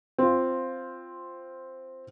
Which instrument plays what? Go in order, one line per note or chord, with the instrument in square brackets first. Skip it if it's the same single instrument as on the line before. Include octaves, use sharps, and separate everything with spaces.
[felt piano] C4 F4